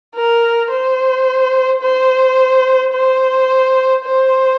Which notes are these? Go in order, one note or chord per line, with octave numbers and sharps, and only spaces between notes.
A#4
C5
C5
C5
C5